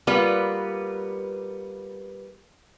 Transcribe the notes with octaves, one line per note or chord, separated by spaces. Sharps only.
G3 A#3 B3 F4 B4